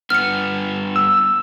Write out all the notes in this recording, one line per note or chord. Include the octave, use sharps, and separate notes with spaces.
G2 B3 F6 C#7
E6